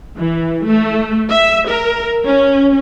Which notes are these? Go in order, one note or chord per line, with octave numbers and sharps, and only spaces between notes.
E3
A3
E5
A#4
C#4